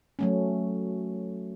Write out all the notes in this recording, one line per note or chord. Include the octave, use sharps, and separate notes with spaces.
F#3 A3 C#4